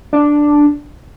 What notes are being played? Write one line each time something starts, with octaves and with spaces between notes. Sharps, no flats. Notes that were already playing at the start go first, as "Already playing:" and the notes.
D4